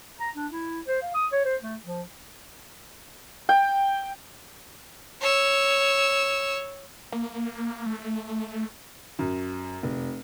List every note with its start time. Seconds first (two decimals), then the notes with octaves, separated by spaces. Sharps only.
0.20 A#5
0.36 D4
0.52 E4
0.87 C5
1.02 F5
1.14 D#6
1.32 C#5
1.45 C5
1.62 A3
1.84 F3
3.49 G5
5.21 C#5 E6
7.12 A#3
7.86 A3
9.19 F#2
9.83 F1